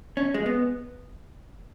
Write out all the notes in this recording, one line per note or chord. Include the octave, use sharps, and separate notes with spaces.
C#4
G#3
B3